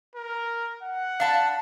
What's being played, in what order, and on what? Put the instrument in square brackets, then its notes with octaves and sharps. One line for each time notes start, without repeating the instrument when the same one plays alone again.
[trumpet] A#4
F#5
[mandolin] D4 A5 B5 [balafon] F5